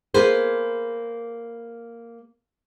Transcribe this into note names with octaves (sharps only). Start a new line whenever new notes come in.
A#3 G#4 B4 C5